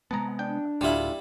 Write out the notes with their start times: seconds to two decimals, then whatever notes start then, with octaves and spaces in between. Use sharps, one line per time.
0.11 C3 G#3 B3 A5 A#5
0.39 D4 G5
0.81 D1 D2 G3 E4 F4 E5